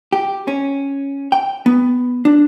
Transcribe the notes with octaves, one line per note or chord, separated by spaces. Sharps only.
G4
C#4
G5
B3
D4